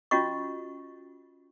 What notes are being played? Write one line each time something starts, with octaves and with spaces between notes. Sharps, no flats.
C#4 F4 F#4 D#5 C#6